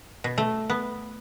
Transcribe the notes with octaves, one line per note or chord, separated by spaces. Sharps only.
B2
A3
B3